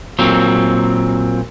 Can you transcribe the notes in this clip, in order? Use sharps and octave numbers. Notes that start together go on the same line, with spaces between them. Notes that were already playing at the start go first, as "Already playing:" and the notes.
A#2 F#3 C4